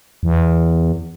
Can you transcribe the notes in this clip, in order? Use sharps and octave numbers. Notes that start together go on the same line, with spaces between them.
E2